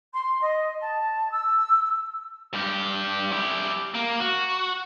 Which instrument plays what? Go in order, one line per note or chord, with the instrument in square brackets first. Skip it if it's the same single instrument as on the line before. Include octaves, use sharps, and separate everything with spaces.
[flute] C6
D#5
A5
E6
[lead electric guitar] G2 G4
E4 G4
A#3
F#4